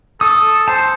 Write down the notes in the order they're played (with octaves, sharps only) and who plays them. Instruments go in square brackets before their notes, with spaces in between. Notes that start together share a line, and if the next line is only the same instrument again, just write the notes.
[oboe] A4 [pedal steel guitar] D#6
[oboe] C5 [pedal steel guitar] A5